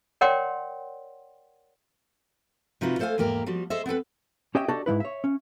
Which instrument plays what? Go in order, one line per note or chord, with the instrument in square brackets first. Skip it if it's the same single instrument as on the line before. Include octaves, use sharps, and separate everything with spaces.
[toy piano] A#4 C#5 D5 F#5 G5 C6
[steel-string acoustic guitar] C3 D#4 F4 F#4 B4
A3 A4 C5 C#5 F5 G#5
E2 G#2 A#3 G4 A#4 A#5
F3 G3 F#4
G#4 A4 C5 D#5 E5
B3 C4 A4 B4
[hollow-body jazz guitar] C#4 G4 C#5 D#5 E5 G5
D4 F#4 G4 A4 D5 D#5
G#2 F3 E4 B4
C#5 E5
C#4